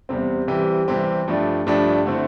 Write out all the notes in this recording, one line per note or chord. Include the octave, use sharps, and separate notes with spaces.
E2 C3 G3 C4
C3 E3 G3 C4 G4
C3 E3 G3 C4 G4
G2 F3 A3 D4 G4
G2 F3 A3 D4 G4
D3 A3 C4 E4